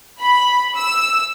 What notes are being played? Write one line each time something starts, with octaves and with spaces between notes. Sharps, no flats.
B5
E6